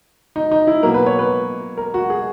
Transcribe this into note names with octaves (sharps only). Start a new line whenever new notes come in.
D#4
D#4
E4
B2 F#3 A#3 A#4
B4
C#5
B4
A#4
F#4
G#4